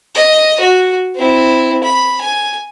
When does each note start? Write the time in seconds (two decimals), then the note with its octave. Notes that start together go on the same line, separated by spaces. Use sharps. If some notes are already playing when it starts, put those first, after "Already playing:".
0.15 D#5
0.60 F#4
1.15 C4 E4
1.83 B5
2.21 G#5